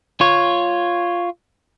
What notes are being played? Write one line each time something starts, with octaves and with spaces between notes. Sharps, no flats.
F4 C#5